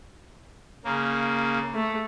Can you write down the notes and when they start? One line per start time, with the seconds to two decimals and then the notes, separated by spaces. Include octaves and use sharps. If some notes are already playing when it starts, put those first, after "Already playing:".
0.85 C#3 A#3
1.74 A3